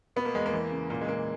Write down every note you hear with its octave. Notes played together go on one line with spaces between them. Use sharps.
B2 B3
A#3
E2 G#3
A#3
E3
C#3
A#2 A#3
G#3
A#2 A#3